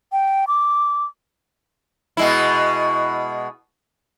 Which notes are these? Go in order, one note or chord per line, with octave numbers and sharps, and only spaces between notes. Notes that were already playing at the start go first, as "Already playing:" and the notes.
G5
D6
B2 G#3 E4